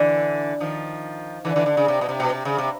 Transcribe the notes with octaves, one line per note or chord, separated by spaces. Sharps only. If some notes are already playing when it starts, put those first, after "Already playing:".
Already playing: D3 E3
D#3 F3
D3 E3
D3 E3
D3
C#3
C3
B2
C3
B2
C3
C#3
C3